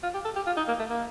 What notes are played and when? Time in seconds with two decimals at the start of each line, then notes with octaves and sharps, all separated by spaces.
0.03 F4
0.14 G4
0.25 A4
0.36 G4
0.46 F4
0.57 D#4
0.68 A#3
0.79 A3
0.90 A#3